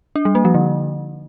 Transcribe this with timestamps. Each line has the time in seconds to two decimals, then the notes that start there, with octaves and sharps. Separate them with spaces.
0.16 D4
0.25 G3
0.35 A#3
0.45 F3
0.54 D3